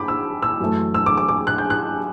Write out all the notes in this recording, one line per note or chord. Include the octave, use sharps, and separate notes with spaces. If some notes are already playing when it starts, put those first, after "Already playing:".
Already playing: B5 D6 G6
E6
E6
F#2 E3 A3
E6
D6
D6
D6
F#6
G6
F#6